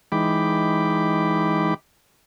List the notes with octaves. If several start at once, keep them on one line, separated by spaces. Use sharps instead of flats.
E3 G#3 D#4 G5 B5 D6